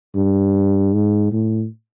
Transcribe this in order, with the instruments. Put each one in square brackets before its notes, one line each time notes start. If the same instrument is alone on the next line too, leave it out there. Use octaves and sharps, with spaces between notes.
[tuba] G2
G#2
A2